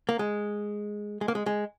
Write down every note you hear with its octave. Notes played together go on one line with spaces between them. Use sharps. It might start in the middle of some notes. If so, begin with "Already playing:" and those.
A#3
G#3
G#3
A#3
G#3
G#3